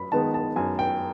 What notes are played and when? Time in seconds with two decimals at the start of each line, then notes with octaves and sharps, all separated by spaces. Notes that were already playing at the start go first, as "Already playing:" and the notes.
Already playing: F#2 B5
0.12 D#3 G#3 B3 A5
0.34 A5
0.56 F#2 G#5
0.79 G5